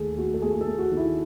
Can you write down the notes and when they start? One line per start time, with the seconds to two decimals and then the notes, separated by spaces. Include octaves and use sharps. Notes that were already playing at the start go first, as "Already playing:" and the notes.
Already playing: D#2 A3 G#4 A4
0.18 A3 F#4
0.34 A4
0.42 A3 G#4
0.53 G#4
0.61 A4
0.67 A3
0.78 F#4
0.91 D#3
0.97 E4